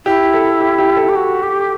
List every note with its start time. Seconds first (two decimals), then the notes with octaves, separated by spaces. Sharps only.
0.06 E4 G4
0.34 A4
0.61 G4
0.78 G4
0.97 A4
1.09 G4
1.15 F#4
1.43 G4